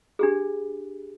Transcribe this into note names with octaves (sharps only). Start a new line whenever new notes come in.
D4 G4 G#4